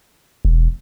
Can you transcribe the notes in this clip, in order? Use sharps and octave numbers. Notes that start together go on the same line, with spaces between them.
E1